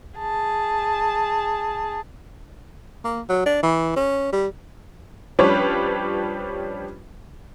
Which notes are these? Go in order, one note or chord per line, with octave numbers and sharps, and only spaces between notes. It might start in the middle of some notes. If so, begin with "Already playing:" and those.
G#4 A5
A#3
F#3
D4
E3
C#4
G3
F3 G3 C#4 D4 B4 C#5